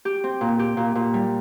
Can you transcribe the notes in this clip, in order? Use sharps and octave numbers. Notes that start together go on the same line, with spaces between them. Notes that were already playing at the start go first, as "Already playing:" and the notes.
G4
C4
A#2
G4
A#2
A#2
G3